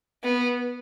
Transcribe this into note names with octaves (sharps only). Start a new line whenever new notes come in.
B3